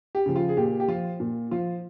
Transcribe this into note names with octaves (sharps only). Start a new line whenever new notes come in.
G4
C#3 F3
F4
G#4
A#2 G4
G4
F3 F4
A#2
F3 F4